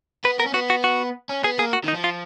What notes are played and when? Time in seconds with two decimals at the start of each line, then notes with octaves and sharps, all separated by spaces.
0.25 B3 B4
0.39 B3 A#4
0.46 C#4
0.54 B3 F#4
0.70 F#4
0.84 F#4
1.29 C#4
1.44 B3 G#4
1.59 A#3 G#4
1.73 F#4
1.84 D#3
1.88 D#4
1.94 F3
2.04 F4